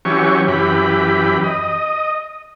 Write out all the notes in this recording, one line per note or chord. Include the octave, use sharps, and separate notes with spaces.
E3 F#3 C#4 G4 C#6
F#2 E3 G4 B5
D#5